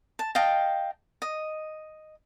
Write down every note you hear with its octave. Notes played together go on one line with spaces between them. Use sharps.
A5
D#5 F5 G5 A5
D#5